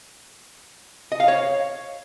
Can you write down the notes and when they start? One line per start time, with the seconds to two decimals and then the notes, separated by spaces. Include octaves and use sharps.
1.12 D#5
1.20 F5
1.28 C#5